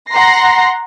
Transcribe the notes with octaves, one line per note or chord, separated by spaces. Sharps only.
F#5 A#5 C6 A#6 C7